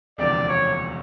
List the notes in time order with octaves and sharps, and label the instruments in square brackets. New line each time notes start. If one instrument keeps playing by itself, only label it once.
[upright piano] E1 D2 C3 F3 A#3 [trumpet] D5
[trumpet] C#5